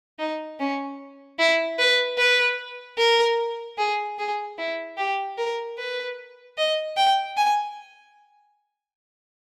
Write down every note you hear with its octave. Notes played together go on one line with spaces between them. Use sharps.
D#4
C#4
E4
B4
B4
A#4
G#4
G#4
E4
G4
A#4
B4
D#5
G5
G#5